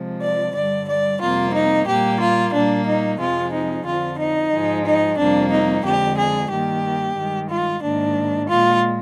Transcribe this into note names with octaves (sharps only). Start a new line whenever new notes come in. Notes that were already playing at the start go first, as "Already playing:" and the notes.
Already playing: C3 F3 G#3
D5
G2 D3 G3 D5
D5
F2 C3 G3 A#3 F4
D#4
A#2 G3 A#3 G4
F4
A#2 G3 A#3 D4
D#4
F2 C3 F3 G#3 F4
D#4
F2 D3 F3 F4
D#4
G#2 F3 G#3
D#4
F2 C3 G3 A#3 D4
D#4
F2 D3 G#3 G4
G#4
G2 D#3 A#3 G4
G2 D#3 G#3
F4
G#2 D#3 A#3 D4
A#2 G#3 F4